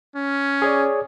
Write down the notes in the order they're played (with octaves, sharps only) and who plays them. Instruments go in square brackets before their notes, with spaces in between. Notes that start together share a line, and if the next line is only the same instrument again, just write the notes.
[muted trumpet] C#4
[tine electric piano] G#4 C#5 D5